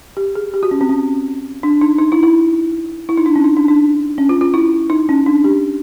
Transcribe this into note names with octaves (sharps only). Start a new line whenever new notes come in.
G4
G#4
G4
F#4
C#4
C4
C#4
D4
D#4
D#4
E4
E4
E4
D#4
D4
C#4
D#4
D4
D4
C#4
F4
F4
E4
D#4
C#4
D4
G4